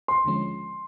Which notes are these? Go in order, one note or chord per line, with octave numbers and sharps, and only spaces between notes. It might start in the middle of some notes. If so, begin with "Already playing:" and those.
C6
D#2 D3 F3 G#3 C#4